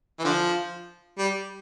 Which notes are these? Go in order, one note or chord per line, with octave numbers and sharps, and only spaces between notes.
E3
D3 F3
G3